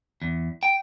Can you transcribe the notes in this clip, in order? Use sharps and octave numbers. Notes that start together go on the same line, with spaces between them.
E2
G5